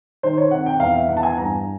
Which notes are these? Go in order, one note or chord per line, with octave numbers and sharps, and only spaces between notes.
D#3 C5
C#5
C3 F#5
G5
E2 F5
E5
E2 F#5
A5
G#5
G2 A#5